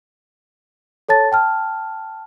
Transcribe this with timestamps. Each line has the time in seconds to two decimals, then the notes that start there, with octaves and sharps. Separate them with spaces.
1.09 A4 C#5 A5 A6
1.32 G5 A5 F6